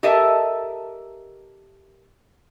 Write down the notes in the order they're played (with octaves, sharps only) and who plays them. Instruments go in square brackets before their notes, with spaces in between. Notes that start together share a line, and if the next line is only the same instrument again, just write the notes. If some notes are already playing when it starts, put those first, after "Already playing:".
[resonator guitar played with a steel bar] G4 A4 A#4 D#5 E5 A5